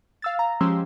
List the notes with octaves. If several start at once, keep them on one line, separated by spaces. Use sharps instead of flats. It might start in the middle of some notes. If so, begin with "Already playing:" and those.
F5 E6 A6
A#5
F3 G#3 C#4 G4 C6 E6